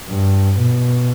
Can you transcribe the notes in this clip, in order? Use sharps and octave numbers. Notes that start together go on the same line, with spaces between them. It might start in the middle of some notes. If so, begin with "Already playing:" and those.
G2
B2